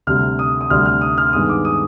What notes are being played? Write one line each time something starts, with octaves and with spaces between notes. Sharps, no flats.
D2 C3 G3 F6
D#6
D#6
D2 C3 G3 F6
F6
D#6
F6
G2 D#3 G#3 B3 D#6
D6
D#6